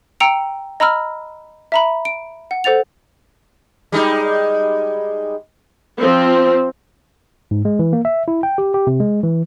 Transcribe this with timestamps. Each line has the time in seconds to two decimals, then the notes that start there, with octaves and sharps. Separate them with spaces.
0.20 G5 A#5 E6 C#7 D7 F7
0.80 D#5 A#5 B5 E6 F6
1.72 E5 A#5 B5
2.05 D7
2.51 F#5
2.64 A4 C5 F#5 A6 F7
3.92 G3 G#3 D#4
5.99 F3 C4
7.51 G#2
7.65 G#3
7.79 E3
7.93 A#3
8.05 E5
8.28 E4
8.43 G5
8.58 G4
8.74 G4
8.87 C3
9.00 G#3
9.23 E3